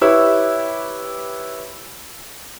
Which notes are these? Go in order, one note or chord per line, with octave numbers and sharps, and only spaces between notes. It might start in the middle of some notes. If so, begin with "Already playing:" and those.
E4 G4 B4 C#5 E6